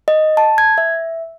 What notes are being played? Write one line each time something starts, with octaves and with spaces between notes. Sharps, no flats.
D#5
A5
G#6
E5